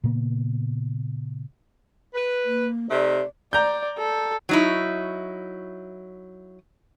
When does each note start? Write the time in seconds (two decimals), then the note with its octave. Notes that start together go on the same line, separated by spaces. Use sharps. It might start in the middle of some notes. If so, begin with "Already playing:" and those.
0.04 A#2 C#3 A#3 B3
2.14 B4
2.44 A#3
2.90 C3 A3 D#4 D5
3.53 D5 A#5 G6
3.98 A4
4.49 F#3 D#4 E4